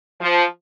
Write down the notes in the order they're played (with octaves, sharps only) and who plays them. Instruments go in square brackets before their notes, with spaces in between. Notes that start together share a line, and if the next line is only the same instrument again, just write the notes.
[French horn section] F3